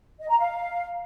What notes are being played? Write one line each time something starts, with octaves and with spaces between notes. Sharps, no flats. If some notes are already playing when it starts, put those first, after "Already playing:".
D#5
A#5
F5